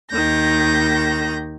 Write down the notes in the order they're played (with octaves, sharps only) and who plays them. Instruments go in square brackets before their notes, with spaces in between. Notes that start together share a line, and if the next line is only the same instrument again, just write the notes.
[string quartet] D#2 D#3 G6 A#6